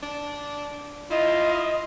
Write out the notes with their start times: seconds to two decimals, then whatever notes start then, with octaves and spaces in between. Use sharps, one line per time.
0.03 D4
1.11 E4 F4 D#5